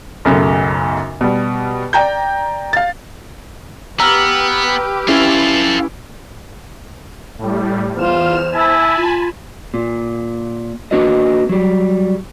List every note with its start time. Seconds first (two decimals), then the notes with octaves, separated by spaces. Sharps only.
0.25 B1 F#2 C#3 A3
1.21 B2 G3
1.93 D5 G5 A#5 G6
2.73 F5 A6
4.00 B3 G4 B4 A#5 E6 F6
5.08 C#4 E4 F4 A4
7.38 A2 G3
7.95 E2 F4 C5 F6 E7
8.51 E4 G#5 A5 B5
8.97 F4
9.74 A#2
10.91 A#3 D4 F#4 B4 D#5
11.49 F#3 G3